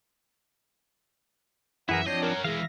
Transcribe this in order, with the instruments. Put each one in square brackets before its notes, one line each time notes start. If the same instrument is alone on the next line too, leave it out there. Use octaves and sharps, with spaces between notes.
[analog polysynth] F#2 E3 [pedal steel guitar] E4 G#4 A#4 [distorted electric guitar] E5 [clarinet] F#5
[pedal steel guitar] F3 C4 D4 [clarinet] C#5 [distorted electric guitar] D#5 [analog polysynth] G6 C7
[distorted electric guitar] C#4 F#4 [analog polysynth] A#4
[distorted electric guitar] E3 G#3 [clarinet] G#4 [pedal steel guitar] E5 F5 [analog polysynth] A#6